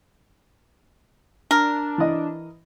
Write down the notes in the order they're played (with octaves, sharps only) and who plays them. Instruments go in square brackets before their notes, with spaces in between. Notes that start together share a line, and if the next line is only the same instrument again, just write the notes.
[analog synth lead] D4 [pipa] A#4
[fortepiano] E3 D#5